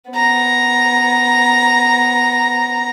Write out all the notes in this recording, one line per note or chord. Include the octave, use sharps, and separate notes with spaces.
B3 A#5